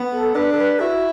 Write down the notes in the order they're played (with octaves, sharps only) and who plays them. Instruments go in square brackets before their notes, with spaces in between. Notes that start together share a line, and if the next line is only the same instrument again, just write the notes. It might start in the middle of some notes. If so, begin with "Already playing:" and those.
Already playing: [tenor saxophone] B3
[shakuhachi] A4
[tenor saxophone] D4 [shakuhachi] B4
[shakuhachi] A4
B4
[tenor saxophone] E4 [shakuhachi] F#4